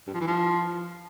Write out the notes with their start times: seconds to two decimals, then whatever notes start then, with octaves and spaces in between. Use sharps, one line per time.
0.07 G2
0.14 F3
0.21 E3
0.27 F3